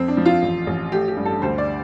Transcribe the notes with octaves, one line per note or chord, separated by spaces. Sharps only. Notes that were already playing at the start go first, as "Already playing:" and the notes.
Already playing: F2 C4
D4
F3
F4
A1
A1
A3 G4
G4
G2
A4
D2 C5
D5